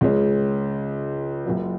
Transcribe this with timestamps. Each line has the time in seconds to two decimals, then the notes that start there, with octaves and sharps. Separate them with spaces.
0.01 C#2 C#3 G#3 C#4
1.46 F#1 F#2 F#3